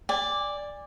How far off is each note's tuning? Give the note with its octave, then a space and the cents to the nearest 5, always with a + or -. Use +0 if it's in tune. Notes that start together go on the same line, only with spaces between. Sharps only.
D5 +0 G#5 -30